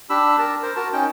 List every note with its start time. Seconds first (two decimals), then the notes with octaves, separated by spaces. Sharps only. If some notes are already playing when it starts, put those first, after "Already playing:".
0.10 D4 G4 B5 E6
0.39 A#4 A5
0.63 A#4 C5
0.76 F#4 A#4 A5
0.93 C#4 D#4 G5